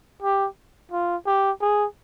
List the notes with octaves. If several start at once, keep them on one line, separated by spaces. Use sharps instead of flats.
G4
F4
G4
G#4